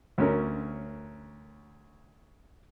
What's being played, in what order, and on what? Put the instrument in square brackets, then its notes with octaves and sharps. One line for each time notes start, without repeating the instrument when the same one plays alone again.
[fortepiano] D2 C#4 A#4